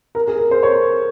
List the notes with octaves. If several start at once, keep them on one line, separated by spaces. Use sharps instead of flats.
A#4
G#4
A#4
C5
C#5